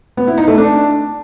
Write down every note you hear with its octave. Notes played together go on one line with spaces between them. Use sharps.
B3
E4
D#4
A3
D4